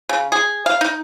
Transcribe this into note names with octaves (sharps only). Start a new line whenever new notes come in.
C#3
G#4
F5
D#4